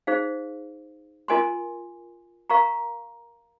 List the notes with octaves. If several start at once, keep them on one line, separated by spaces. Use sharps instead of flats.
D#4 G#4 C5 F5
F4 A#4 D#5 G#5 C6
A#4 F5 A#5 C#6